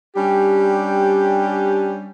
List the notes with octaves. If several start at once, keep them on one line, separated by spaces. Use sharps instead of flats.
G3 C#4 D4 G4